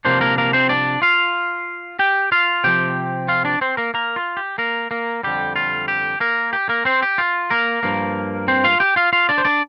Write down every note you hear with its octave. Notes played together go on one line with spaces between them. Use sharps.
C3 F3 A#3 C4 D4 C5
A#3 A#4
A#3 A#4
C4 C5
D4 D5
F4 F5
G4 G5
F4 F5
C3 F3 C4 G4 G5
F4 F5
D4 D5
C4 C5
A#3 A#4
A#3 A#4
F4
G4
A#3 A#4
A#3 A#4
F2 D3 G3 G4
F4
G4
A#3 A#4
G4
A#3 A#4
C4 C5
G4
F4
A#3 A#4
G2 F3 A#3
C4 C5
F4 F5
G4 G5
F4 F5
F4 F5
D4 D5
C5
D4 D5